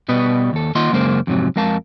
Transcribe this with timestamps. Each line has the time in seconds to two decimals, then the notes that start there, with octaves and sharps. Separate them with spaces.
0.09 B2 G3 B3 B4 D#5
0.53 D#2 A4
0.75 D#3 A#3 F4 D#5 F#5 C6
0.92 F#2 C#3 G#3 A#3 C5
1.27 F2 G#2 C3 F#3
1.56 F2 G#3 A#4 F5 A5